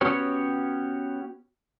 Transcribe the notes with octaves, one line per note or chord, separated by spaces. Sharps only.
B3 C#4 F#4 G4 C#5